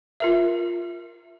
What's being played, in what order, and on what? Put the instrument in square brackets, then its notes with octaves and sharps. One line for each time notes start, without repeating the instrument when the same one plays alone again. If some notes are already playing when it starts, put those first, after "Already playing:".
[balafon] F4 A#4 E5